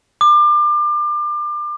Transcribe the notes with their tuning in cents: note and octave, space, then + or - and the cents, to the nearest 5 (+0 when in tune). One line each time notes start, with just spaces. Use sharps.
D6 +30